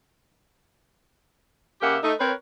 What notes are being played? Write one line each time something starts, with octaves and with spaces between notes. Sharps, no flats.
C#3 A#3 G4 E5 F#5
A3 D#4
C4 A#4 B4 C#5